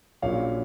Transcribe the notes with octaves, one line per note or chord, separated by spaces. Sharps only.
A#1 A#2 F#3 C#4 C#5 F5